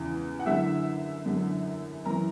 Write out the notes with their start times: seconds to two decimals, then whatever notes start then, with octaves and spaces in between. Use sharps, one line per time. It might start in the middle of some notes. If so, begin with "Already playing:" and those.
Already playing: E2 C#3 E3
0.39 F#5
0.46 F#2 D3 E4 E5
1.26 F#2 D3
2.05 F#2 E3 A#4 A#5